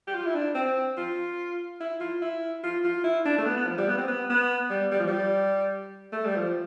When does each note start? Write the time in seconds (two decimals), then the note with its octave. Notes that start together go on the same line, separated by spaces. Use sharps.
0.07 G4
0.14 F4
0.26 E4
0.35 D4
0.55 C4
0.97 F4
1.81 E4
2.00 F4
2.22 E4
2.64 F4
2.84 F4
3.04 E4
3.25 D4
3.38 A3
3.46 B3
3.57 B3
3.66 F3
3.78 G3
3.88 B3
3.98 C4
4.08 B3
4.30 B3
4.70 G3
4.92 G3
5.00 F3
5.07 G3
6.13 A3
6.25 G3
6.36 F3